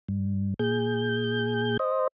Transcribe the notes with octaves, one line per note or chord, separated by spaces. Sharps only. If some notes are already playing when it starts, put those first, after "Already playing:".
G2
A#2 G#4 G6
C5 D#5